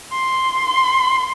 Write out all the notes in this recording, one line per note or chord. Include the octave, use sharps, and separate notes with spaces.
C6